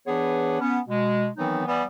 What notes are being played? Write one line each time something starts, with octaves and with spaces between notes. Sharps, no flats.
E3 B3 D4 G#4 B4 C#5
B3 C#4
B2 G#3
D#3 E3 F#3 B3 C4 D#4
E3 G3 B3